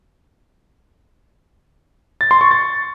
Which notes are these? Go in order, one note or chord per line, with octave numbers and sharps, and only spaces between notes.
A6
C6
C#6
A6